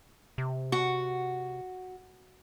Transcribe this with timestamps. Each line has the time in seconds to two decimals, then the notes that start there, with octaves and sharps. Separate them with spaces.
0.38 C3
0.72 F#4